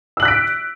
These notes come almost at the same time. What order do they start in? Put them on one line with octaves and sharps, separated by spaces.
E6 F#7 F#6 B6 D7